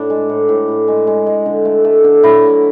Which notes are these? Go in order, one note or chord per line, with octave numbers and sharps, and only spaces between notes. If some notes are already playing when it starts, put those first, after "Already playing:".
Already playing: A2 D4
G#3
A2
A2
A2
G#3
G#3
G#3
D3
A3
A3
D3
F#3 E4
A3